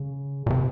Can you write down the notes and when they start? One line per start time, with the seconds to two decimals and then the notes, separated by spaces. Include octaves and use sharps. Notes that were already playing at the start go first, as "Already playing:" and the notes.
Already playing: C#3
0.46 A#2
0.50 C3